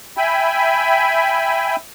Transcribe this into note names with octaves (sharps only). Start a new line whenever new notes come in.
E5 G5 G#5 B5